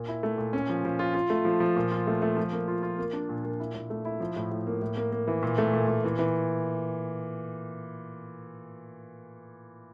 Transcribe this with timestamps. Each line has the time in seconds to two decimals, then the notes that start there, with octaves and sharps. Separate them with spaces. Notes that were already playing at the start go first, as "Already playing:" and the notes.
Already playing: A#2
0.08 E4
0.23 A3
0.38 A#2
0.53 C#4
0.70 F3
0.85 F3
0.99 F4
1.15 F4
1.30 A3
1.45 F3
1.60 F3
1.77 A#2
1.92 F4
2.07 A3
2.22 A3
2.37 F3
2.52 A#3
2.68 F4
2.83 F4
2.98 A#3
3.13 D4
3.29 A#2
3.45 A#2
3.60 E4
3.75 A#2
3.90 A3
4.05 E4
4.20 F3
4.36 A2
4.52 A2
4.67 A#3
4.82 A2
4.97 A#3
5.12 A#3
5.27 E3
5.43 A#2
5.58 A3
5.73 A#2
5.88 A#2
6.04 E3
6.19 E3